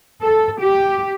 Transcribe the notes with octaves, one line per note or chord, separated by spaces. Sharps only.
A4
G4